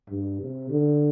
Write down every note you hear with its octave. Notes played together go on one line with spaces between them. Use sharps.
G2
C3
D3